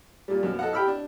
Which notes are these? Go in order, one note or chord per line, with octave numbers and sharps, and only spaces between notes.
A#2 G3
F#2 B2
A4 D#5 F#5
G4 G5 B5 E6 F6
D4